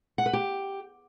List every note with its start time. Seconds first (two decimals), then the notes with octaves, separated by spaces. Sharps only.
0.18 F#5
0.26 B4
0.33 G4